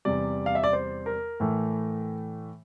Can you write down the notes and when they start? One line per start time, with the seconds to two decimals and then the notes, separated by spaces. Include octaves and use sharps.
0.05 E2 C3 G3 D5
0.46 F5
0.55 E5
0.64 D5
0.73 C5
1.06 A#4
1.40 A2 E3 A3